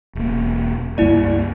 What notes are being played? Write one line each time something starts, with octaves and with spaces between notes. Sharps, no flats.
E1 A#3
C#2 G2 A#3 E4 D5